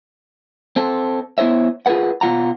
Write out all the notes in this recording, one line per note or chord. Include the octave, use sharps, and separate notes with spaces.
C4 A4
B3 E4 C5 C#5 E5
F4 G#4 A#4 B4 F#5
B2 F4 F#5 A#5